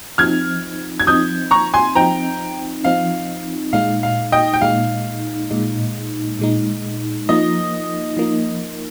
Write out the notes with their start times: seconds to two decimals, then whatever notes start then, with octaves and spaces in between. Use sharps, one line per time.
0.18 F3 C4 D#4 F6 G#6
1.00 G#6
1.07 F3 C4 D#4 D#6 G6
1.51 A#5 C#6
1.74 G#5 C6
1.95 F3 C4 D#4 G5 A#5
2.84 F3 C4 D#4 F5
3.73 A#2 G#3 D#4 F5
4.03 F5
4.32 D#5 G5
4.54 G5
4.61 A#2 G#3 D#4 F5
5.51 A#2 G#3 D#4
6.39 A#2 G#3 D#4
7.29 F3 A#3 D#4 D#5
8.17 F3 A#3 D#4